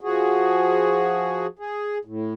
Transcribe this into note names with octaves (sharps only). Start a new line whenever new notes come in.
F3 F#4 G#4
G#4
A2